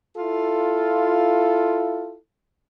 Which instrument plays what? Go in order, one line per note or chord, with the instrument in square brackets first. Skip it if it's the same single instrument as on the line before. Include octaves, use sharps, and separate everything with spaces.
[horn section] E4 F4 [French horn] A4